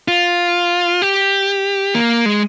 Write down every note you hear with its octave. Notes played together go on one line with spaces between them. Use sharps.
F4
G4
A#3
G#3